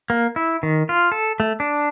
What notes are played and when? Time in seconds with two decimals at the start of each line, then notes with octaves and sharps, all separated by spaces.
0.10 A#3
0.36 E4
0.63 D#3
0.89 F4
1.12 A4
1.40 A3
1.60 D4